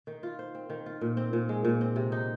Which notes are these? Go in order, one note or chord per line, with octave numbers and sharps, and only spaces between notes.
D#3
F4
C5
C4
D#3
F4
A#2
C4
A#2
G#3
A#2
C4
C3
D#4